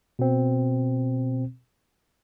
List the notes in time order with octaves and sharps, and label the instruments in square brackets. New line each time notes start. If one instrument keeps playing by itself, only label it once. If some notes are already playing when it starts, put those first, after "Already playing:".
[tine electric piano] B2 C4